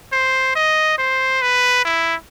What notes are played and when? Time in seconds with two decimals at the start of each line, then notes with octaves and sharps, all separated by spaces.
0.13 C5
0.56 D#5
0.99 C5
1.42 B4
1.85 E4